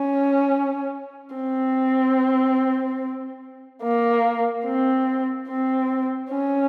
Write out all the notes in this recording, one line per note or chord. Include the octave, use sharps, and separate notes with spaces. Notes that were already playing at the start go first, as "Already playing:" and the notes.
Already playing: C#4
C4
A#3
C4
C4
C#4